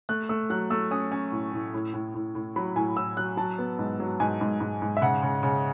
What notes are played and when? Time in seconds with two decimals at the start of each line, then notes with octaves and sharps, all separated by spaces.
0.09 A3 F#6
0.29 A3 E6
0.50 F#3 F#6
0.70 A3 E6
0.91 C#4 D#6
1.12 C#4
1.32 A2
1.53 A2
1.74 A2
1.94 A2
2.14 A2
2.35 A2
2.56 F#3 B5
2.76 A2 G#5
2.97 A2 E6
3.17 F#3 F#6
3.37 F#3 A5
3.58 B3
3.79 G#2
4.00 F#3
4.20 G#2 G#5
4.41 G#2
4.60 G#2
4.82 G#2
4.97 E5
5.02 C#3 F#5
5.23 C#3
5.43 C#3